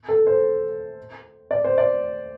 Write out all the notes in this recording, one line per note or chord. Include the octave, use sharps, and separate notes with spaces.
A4
C5
D5
C5
D5